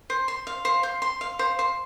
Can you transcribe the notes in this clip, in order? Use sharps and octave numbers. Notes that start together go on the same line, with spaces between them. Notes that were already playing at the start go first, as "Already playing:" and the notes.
C5
C6
F5
C5
C5
C6
F5
C5
C5